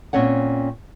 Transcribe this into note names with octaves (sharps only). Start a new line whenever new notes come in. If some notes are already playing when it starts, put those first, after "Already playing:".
A#2 C4 C#4 C#5 F#5